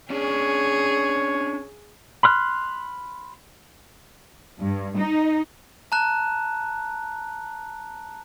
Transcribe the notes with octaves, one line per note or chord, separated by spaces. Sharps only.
C#4 D4 G#4 C#5
B5 C6 F6 F#6
G2
D#4
A5 A#5 F#6